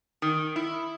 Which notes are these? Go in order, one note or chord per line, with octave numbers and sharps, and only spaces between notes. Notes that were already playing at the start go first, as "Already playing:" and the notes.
D#3
E4